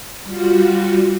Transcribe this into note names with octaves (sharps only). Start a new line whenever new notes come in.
G3 F4 F#4